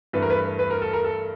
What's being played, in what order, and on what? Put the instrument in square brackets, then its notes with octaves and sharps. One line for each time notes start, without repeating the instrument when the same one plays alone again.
[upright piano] G2 E3 A3 B4
A#4
B4
B4
A#4
A4
A#4
A4